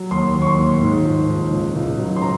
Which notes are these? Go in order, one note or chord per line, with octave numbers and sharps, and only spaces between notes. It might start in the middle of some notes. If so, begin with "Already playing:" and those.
Already playing: F#3
D#2 C6
D#2
C#6
C6
D#2
G#2
F3
G#2
C#2
C#2
F#3
C6
F3 A#5